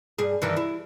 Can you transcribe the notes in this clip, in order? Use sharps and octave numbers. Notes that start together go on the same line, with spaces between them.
G2 G#4
G2 D#3 E3
E4